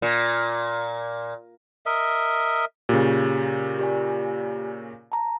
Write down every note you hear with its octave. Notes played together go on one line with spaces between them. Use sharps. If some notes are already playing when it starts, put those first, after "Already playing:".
A#2
A#4 D#5 E5
A#2 C#3 G4
G4 D5 G#5
A5 A#5